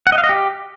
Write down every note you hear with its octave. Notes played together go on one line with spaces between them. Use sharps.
F#5
D#5
F5
D#5
G4